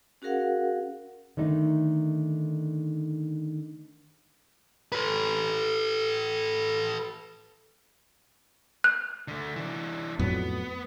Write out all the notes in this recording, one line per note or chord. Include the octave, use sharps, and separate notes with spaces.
C#4 F#4 G#4 A#4 F5 F#5
D3 D#3 A3 D#4
A4 B4
F#6
D3 A3
E3 D4
F2 A2 F#3 B3